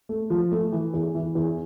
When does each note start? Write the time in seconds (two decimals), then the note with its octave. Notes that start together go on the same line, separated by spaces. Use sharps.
0.09 A3
0.30 F3
0.52 A3
0.72 E3
0.94 E2
1.15 E3
1.35 E2